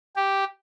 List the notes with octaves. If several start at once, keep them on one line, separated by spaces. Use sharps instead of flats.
G4